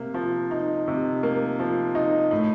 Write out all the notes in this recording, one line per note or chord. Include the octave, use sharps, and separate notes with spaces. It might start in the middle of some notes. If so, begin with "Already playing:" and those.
Already playing: C3 A#3
F3
D#4
C3
A#3
F3
D#4
A2